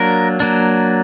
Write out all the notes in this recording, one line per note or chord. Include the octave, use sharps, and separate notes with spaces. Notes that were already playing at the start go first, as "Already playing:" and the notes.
Already playing: F#3 A#3 D4 A#4
F#3 A#3 D4